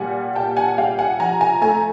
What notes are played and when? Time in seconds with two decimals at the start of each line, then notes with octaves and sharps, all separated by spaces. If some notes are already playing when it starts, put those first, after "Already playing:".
Already playing: A#2 G3 F#5 G#5
0.35 A#2 G5 A5
0.57 F#5 G#5
0.78 G3 F5 G5
0.99 F#5 G#5
1.20 F3 G#5 A#5
1.41 G#5 A#5
1.62 A3 G#5 A#5